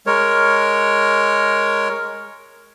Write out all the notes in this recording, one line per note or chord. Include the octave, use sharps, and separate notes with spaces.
G#3 A#4 C#5